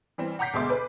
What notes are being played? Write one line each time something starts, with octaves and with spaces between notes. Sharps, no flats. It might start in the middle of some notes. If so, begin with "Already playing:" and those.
E3 G3 C4
F#5 A#5 D6 G6 B6 C7
D2 B2 G#3 E5 C6 D6
B4